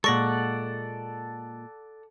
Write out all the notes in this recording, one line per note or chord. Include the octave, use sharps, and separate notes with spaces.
A#2 G#3 A4 D5 F#5 C#6 A#6